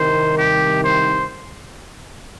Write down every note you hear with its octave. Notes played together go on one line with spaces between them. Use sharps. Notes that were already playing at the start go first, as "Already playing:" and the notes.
Already playing: C2 C3 D#3 C5
G4
C5